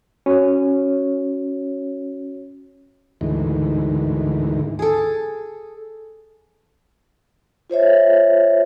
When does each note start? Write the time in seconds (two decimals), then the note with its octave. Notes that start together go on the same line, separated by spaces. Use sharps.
0.26 C#4 F#4 C#5
3.21 D2 G#2 D#3 E3
4.79 G#4 A4
7.70 F4 C5 C#5 E5